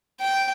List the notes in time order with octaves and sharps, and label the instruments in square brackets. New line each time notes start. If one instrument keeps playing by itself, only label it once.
[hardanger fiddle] G5